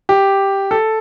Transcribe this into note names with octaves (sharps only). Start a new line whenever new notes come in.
G4
A4